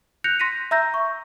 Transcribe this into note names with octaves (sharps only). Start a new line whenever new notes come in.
F#6 G6 A#6 C#7 F7
C6 A#6 B6 D#7
E5 A#5 E6 G6 A#6
C#6